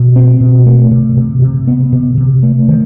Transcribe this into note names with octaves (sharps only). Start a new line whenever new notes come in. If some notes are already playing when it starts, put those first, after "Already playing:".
Already playing: B2
C4
B2
A3
C3
C3
C3
B3
C3
C3
A3
D#3